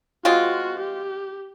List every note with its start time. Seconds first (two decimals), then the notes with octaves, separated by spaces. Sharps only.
0.25 G#3 C4 F4 F#4
0.80 G4